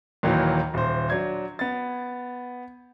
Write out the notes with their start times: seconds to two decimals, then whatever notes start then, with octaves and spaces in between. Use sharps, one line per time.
0.23 D#2 A#2 D#3 E3 F#3
0.74 D#1 C5
1.10 F#3 D4 G#6
1.59 B3 A6